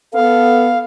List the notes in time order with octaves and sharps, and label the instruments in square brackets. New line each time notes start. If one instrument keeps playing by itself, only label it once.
[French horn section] B3 A4 [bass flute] F5